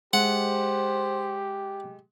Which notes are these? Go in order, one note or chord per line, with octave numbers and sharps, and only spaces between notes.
G#3 G4 C5 F#5